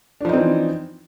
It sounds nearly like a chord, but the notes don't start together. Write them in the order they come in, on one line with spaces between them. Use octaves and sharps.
D4 F3 D#4 C4 E3